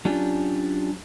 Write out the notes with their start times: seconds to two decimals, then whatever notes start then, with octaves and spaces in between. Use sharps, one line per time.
0.05 F#3 C#4 D4 F4 G4